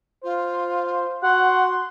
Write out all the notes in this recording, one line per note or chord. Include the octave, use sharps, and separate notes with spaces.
F4 C5
F#4 F#5 C6